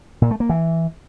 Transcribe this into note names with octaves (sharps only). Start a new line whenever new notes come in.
A#2
A3
A#3
E3